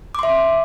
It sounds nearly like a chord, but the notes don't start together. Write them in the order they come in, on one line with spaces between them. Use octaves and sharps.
D6 C6 E5